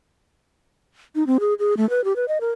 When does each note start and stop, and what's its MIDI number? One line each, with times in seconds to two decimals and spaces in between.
1.15 1.26 63
1.27 1.38 60
1.40 1.54 68
1.59 1.77 68
1.77 1.88 57
1.90 2.04 71
2.04 2.15 67
2.16 2.25 71
2.28 2.38 75
2.41 2.51 70